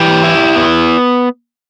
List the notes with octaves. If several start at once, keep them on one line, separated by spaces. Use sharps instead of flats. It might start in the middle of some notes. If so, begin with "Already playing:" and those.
Already playing: E3 G4
E4
B3